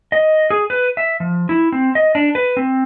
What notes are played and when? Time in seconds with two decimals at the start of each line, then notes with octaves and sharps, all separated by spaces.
0.12 D#5
0.50 G#4
0.70 B4
0.97 E5
1.20 F3
1.49 E4
1.72 C4
1.95 D#5
2.15 D4
2.35 B4
2.57 C4